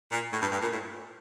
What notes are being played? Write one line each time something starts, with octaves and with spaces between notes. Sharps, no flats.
A#2
A2
G2
G2
A#2
A2